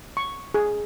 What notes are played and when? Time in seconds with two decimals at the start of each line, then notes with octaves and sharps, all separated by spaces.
0.17 C#6
0.54 G#4